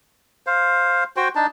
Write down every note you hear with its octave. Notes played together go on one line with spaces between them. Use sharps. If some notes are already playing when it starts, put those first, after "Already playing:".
C5 F5
F#4 C5 G5
D4 D#4 A5